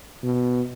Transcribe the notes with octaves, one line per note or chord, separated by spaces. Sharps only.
B2